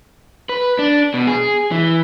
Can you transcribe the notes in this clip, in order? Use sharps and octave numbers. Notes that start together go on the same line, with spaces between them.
B4
D4
B2
G#4
E3